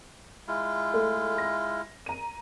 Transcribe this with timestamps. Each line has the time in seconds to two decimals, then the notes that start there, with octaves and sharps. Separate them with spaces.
0.48 G#3 E4 F4
0.94 A3
1.38 A#6
2.06 A#5 D#7